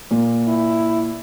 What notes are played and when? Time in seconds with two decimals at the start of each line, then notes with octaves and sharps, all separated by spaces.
0.11 A#2
0.48 E4